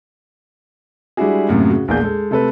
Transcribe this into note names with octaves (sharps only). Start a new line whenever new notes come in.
G3 G#3 D4 E4 F#4 G#4
F#2 A2 C3 A#3
C#3 F#4
A#1 E2 A#3 G#4 D5 G6
G#3 A4
C3 A3 A4 B4